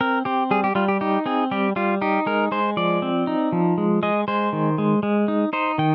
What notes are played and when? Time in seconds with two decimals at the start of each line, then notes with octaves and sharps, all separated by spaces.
0.01 C4 A#4
0.25 C4 G4
0.51 G3 G#4
0.64 G4
0.75 G3 F4
0.88 G4
1.01 D#4 G4
1.26 C4 G#4
1.51 G3 G4
1.76 G3 F4
2.01 D#4 G4
2.26 G#3 A#4
2.52 G#3 C5
2.77 F3 D5
3.02 C4
3.27 D#4
3.52 F3
3.78 G#3
4.03 G#3 D#5
4.28 G#3 C5
4.53 D#3
4.78 G#3
5.03 G#3
5.28 D#4
5.53 D#4 C5
5.78 D#3 G5